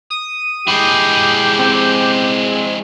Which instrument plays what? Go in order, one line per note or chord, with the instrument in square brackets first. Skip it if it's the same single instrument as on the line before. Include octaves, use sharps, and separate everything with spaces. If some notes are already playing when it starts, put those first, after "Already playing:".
[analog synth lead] D#6
[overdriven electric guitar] G#3 E4 [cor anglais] G4
[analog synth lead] C4